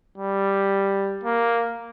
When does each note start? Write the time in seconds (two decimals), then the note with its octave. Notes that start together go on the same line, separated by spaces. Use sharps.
0.18 G3
1.24 A#3